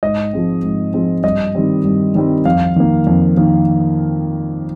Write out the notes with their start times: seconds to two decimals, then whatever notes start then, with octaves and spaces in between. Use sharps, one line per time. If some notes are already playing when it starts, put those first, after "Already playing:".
0.03 G#2 D#5
0.33 F3 G#3 C4
0.63 G#2
0.94 F3 G#3 C4
1.23 G2 D#5
1.55 D#3 G3 C4
1.85 G2
2.15 D#3 G3 C4
2.45 F2 F5
2.76 D#3 A#3
3.07 F2
3.37 D#3 A#3